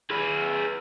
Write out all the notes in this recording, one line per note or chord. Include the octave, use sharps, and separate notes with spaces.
G#4 B4